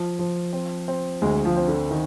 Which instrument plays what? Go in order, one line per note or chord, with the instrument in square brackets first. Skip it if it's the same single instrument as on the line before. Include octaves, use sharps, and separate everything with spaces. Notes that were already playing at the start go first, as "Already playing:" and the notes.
Already playing: [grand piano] F3
F3
C4
C4
[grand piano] D2 [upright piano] G#3
[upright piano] F3
[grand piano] C4
[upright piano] D3
D#3